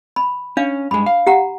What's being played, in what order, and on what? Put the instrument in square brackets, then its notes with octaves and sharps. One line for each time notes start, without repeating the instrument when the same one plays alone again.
[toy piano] B5
[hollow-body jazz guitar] C#4 [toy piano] D4 F5
[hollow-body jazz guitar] G2 G#3 [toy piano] B5
[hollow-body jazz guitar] F5
[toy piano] G4 F#5 A#5